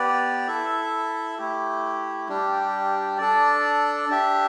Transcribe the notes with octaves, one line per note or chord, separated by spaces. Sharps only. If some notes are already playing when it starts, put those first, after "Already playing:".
Already playing: B3 G4 B4 D5
E4 A4 E5
A3 E4 G4
G3 D4 G4
D4 A4 D5
D4 G4 E5